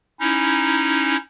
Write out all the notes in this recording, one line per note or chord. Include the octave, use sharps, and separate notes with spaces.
C#4 D#4 E4